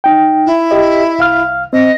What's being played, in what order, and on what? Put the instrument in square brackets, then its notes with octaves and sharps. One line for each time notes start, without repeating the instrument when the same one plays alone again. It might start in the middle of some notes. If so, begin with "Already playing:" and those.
[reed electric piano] D#4 G5
[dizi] E4
[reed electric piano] G4 D#5
C2 F5 F6
[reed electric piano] C4 [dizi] D#5